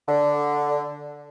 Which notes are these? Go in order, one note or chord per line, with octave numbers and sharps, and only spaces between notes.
D3